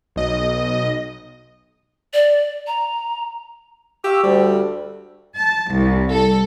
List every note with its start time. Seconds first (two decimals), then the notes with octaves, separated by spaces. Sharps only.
0.16 B1 D#5
2.13 D5
2.67 A#5
4.04 G4 F5 C#6 E6
4.23 D2 G3
5.36 A5
5.73 C2
6.11 A4